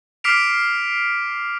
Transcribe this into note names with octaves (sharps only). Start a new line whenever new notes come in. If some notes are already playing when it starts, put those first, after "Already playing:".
D6 F6 B6 C7 D7 F7